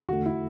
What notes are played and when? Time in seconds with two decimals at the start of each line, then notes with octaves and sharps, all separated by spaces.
0.09 E2 D3 A3 F#4
0.26 E4